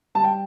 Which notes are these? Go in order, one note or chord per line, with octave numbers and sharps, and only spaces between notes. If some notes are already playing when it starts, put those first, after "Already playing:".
G3 A5
G5